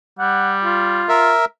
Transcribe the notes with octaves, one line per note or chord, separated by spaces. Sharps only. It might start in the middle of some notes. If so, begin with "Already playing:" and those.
G3 F#5
F4
A#4 E5